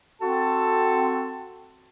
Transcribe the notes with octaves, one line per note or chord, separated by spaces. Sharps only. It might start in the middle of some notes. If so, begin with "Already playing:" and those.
C4 F#4 A4 A5